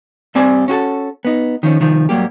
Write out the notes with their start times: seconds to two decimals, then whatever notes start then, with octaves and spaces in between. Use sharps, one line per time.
0.35 G2 G3 C4 D5 G#5
0.68 C#4 F#4 G#4 A4
1.25 B3 D#4
1.63 D#3 F3 C#4
1.80 C2 D#3 F3
2.09 G#2 F#3 G3 A#3 G4